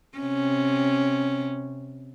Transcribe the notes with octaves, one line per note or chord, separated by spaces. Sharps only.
C3 C#4